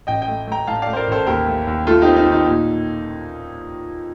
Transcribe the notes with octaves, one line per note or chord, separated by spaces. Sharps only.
A1 D#5 G5
D#5 G5
A3
A3 G5 A#5
A2 F5 A5
A3 D5 F5
C5
A#4 D5
A1 A4 C5
D#2 G4 A#4
A3
D#2
A3 F4 A4
C4 D#4 G4
D#4
D#3
D#4
A#2